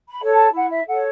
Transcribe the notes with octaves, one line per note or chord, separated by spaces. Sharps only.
B5
A4 C#5
A5
E4 F#5
E5
A4 C#5 F#5